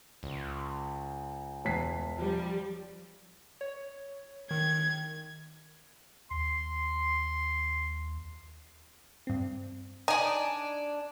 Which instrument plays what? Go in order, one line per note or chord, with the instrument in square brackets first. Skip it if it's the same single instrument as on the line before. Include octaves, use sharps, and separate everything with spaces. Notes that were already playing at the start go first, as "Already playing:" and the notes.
[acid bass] C#2
[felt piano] E1 B6 C7
[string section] F3 G3
[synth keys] C#5
[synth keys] D#3 [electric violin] G#6
[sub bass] D#2 [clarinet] C6
[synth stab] G2 C4
[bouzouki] D4 G#5 [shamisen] D#4